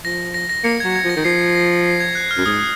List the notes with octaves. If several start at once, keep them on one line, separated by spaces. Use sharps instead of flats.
F3 A#6
A#6
A#6
A#3 C#7
F#3 G#6
G#6
F3
A#6
D#3
F3 C7
A#6
C7
G#6
F#6
F6
F#2
G#2 D#6